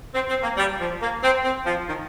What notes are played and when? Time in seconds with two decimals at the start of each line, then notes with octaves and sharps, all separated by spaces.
0.15 C4
0.29 C4
0.43 A#3
0.57 G3
0.80 F3
1.02 A#3
1.24 C4
1.45 C4
1.66 F3
1.89 D#3